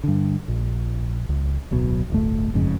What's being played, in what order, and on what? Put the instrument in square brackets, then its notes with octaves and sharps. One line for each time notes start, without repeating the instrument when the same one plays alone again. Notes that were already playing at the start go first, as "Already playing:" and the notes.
[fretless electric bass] G2 D3
A#1
C#2
D1 B1 B2 F#3
D1 G1 A3
F#1 F2 G#2 C#3